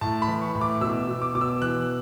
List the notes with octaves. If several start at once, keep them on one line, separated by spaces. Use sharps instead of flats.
A2 A5
B5
E3
C#6
A2
D6
B2 E6
B2
D6
B2 D6
E6
E3 F#6